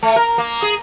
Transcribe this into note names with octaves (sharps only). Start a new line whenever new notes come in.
A3
A#4
A#3
G#4